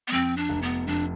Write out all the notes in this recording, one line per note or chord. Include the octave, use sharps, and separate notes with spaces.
B3
F2 C4
D4
F1
B3
F2 D4